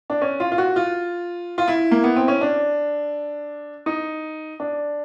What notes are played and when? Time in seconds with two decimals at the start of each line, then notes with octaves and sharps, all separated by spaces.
0.10 D4
0.21 C#4
0.40 F4
0.52 F4
0.58 F#4
0.76 F4
1.58 F4
1.68 E4
1.91 A#3
2.04 B3
2.16 C4
2.28 C#4
2.41 D4
3.86 D#4
4.60 D4